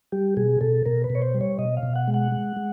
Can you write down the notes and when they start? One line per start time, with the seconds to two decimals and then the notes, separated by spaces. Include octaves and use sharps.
0.12 G3 G4
0.37 B2 G#4
0.61 B2 A4
0.86 B2 A#4
1.04 B4
1.10 B2
1.15 C#5
1.22 C5
1.34 G3
1.41 C#5
1.59 B2 D#5
1.77 F5
1.83 B2
1.96 F#5
2.08 G#3
2.14 F#5
2.32 G#3
2.56 G#3